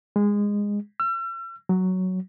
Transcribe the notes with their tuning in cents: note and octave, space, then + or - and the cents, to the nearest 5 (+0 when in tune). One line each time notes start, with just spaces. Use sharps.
G#3 -20
E6 +45
F#3 +5